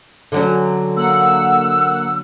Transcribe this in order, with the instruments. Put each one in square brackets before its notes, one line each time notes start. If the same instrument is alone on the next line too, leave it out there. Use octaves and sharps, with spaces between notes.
[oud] D3 F#3 C#4
[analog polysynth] A#3 F#5 [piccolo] E6